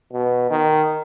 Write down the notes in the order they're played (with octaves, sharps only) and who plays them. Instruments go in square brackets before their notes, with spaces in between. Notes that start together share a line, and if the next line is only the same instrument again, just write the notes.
[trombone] B2
D#3